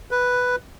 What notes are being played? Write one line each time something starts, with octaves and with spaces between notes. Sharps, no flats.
B4